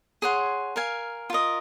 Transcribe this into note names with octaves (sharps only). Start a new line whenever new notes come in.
G#4 C#5 F#5 C6
A#4 F5 G#5
F4 A#4 D#5